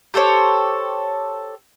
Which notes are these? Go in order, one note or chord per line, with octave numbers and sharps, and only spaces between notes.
G4 A4 C5 C#5